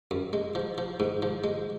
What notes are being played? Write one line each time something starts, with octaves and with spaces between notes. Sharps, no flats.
F#2
G#3
F3
F3
G#2
F3
G#3